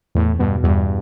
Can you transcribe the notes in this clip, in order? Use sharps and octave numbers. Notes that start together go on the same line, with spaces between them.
E2 A2
G2 B2
E2 G2